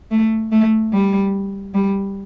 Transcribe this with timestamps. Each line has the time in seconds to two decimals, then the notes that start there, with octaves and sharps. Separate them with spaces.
0.11 A3
0.52 A3
0.93 G3
1.75 G3